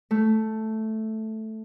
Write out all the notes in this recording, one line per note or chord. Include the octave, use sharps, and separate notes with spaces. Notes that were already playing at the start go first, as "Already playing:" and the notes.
A3